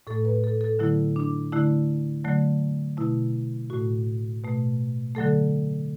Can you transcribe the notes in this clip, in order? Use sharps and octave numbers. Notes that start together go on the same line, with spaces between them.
A2 A3 A4
B4
A4
A4
D3 F#3 A3 E4
D4
D3 A3 E4
D3 F#3 A3
B2 A3 E4
A2 A3 F#4
B2 A3
D3 F#3 A3 A4